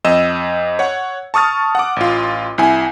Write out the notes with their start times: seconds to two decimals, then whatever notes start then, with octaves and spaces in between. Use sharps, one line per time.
0.05 F2 D#5 E6 E7
0.79 C#5 F#5
1.34 A5 C#6 D#6 F6 A6
1.75 F#5 D6
1.96 A1 F4
2.58 C2 E4 G#5